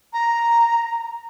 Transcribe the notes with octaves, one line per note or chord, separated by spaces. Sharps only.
A#5